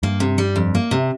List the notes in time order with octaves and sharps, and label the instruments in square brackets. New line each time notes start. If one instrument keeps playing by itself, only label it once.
[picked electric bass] G2 [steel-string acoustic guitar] A#3
[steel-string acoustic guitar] C3
G3
F2
A#3
C3